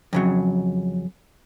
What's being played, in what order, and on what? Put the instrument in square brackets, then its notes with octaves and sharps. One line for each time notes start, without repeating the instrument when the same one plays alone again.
[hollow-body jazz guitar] F2 C#3 F#3